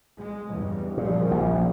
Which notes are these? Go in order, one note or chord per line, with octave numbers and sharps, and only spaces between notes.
G#3
E2 G2 C#3
A#2 C#3 F3 G3
A#1